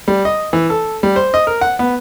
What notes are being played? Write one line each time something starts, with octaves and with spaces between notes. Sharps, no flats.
G3
D#5
E3
A4
G3
C5
D#5
A#4
F#5
B3